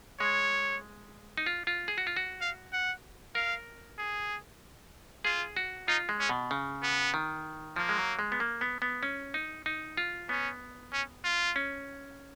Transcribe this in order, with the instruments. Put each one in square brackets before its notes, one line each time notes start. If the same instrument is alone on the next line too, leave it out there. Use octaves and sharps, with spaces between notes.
[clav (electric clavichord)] G#3 [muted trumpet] C#5
[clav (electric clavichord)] D#4
F4
F4
G#4
F#4
F4
F#4
[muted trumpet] F5
F#5
[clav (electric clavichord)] A#4 [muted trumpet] F5
[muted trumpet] G#4
[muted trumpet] F4 [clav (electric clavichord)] G#4
[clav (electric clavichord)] F#4
[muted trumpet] D#4 [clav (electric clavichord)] F4
[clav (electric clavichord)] G#3
[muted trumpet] C#4
[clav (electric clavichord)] B2
C#3
[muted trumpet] B3
[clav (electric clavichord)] D#3
[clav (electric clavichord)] F3 [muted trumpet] A#3
[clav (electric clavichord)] G#3
F#3
G#3
B3
A#3
B3
B3
C#4
D#4
D#4
F4
[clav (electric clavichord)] B3 [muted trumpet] C#4
[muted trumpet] C#4
F4
[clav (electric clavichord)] C#4